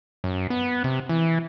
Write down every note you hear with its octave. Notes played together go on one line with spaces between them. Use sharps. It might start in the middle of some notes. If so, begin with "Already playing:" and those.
F#2
B3
C3
E3